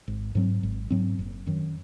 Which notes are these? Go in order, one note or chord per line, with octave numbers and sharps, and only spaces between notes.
G#1
G#2 F#3 C4
G#1
G#2 F#3 C4
F#1
F#2 D#3 F#3